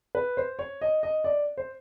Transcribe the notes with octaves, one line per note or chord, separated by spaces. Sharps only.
B4
C5
C#5
D#5
D#5
D5
C5